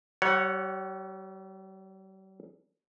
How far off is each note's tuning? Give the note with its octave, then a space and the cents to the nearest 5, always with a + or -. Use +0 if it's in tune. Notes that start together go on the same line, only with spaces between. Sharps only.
G3 -45 C#5 -10 F#5 +0